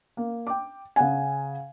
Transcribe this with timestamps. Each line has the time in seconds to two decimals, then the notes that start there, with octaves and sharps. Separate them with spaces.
0.17 A#3
0.47 G5 D6
0.96 C#3 F#5 G#5